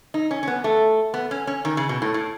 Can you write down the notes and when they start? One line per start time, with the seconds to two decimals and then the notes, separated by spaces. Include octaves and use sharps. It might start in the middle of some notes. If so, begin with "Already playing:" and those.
0.14 D#4
0.31 C#4
0.43 C#4
0.48 B3
0.64 A3
1.14 B3
1.31 C#4
1.47 C#4
1.65 D#3
1.77 C#3
1.89 B2
2.02 A2
2.14 A2